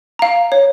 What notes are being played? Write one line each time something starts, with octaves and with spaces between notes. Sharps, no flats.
F5 A#5
C#5